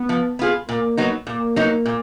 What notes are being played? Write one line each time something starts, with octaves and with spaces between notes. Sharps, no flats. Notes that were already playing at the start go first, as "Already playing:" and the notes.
Already playing: B3
F3
B3 F4 G#4
A#2 A#3
F#3 B3 D#4
A#2 A#3
F#3 B3 D#4
A#2